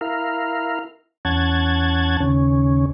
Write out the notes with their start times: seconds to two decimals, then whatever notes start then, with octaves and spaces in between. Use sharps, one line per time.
0.01 E4 A#4 F5
1.25 E2 C#4 F#5 A5 G#6
2.20 D#2 C#3 C#4